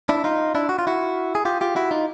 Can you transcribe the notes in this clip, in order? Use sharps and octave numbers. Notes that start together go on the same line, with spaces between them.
D4 E4
D#4 F4
D4 E4
F#4
F4
E4 F#4
G#4
F4 G4
F4 G4
E4 F#4
D#4 F4